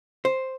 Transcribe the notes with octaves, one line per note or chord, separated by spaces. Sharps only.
C5